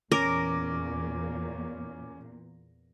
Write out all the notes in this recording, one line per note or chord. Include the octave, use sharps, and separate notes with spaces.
E2 A#2 C#4 A#4 D6 A#6